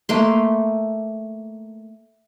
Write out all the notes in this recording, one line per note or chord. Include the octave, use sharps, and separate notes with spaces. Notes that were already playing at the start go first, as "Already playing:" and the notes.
A3 A#3 C6